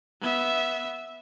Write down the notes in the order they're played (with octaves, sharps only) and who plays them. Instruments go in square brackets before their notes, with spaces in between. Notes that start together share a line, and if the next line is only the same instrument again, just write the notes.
[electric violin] B3 E5